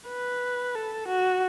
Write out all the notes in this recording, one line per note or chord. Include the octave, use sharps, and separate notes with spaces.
B4
A4
F#4